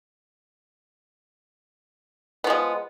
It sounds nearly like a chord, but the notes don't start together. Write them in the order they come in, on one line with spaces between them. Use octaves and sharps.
B3 F3 G#3